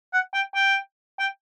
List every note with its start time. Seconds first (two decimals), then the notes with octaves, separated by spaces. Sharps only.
0.13 F#5
0.34 G5
0.55 G5
1.19 G5